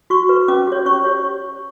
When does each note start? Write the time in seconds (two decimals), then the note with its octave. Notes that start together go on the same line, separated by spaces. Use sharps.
0.10 F#4 C#6
0.29 B4
0.48 C#4 D6
0.67 G4 C#5
0.86 C#4 C#6
1.04 G4 C#5